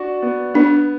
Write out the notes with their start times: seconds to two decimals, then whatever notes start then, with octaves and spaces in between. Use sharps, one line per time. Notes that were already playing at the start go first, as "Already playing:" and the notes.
Already playing: D4 F#4
0.22 B3
0.54 B3 D4